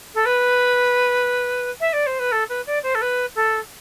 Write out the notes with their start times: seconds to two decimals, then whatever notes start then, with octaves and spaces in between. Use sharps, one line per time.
0.14 A4
0.25 B4
1.80 E5
1.93 D5
2.06 C5
2.19 B4
2.32 A4
2.49 B4
2.66 D5
2.83 C5
2.95 A4
3.01 B4
3.35 A4